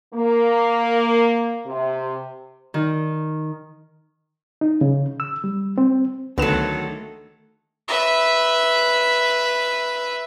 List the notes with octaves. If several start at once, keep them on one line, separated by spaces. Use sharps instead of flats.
A#3
C3
D#3
D#4
C#3
E6
G3
C4
C#2 D3 D#3 F#3 A3 B3 A4 E7
B4 E5